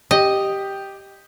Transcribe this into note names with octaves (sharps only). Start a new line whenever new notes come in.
G4 D#5